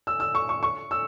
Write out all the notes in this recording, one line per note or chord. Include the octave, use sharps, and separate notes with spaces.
E6
E6
C#6
C#6
C#6
E6